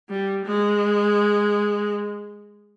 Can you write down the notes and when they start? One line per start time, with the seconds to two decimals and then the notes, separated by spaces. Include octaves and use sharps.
0.09 G3
0.45 G#3